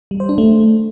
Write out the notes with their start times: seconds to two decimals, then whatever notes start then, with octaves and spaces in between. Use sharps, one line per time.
0.11 G3
0.20 C5
0.29 D4
0.38 A3